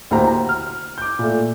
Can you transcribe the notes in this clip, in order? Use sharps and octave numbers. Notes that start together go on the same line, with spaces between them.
D2 A2 A#3 G4 C5 A#5
A#5
F6
D6 G6
A#2 A3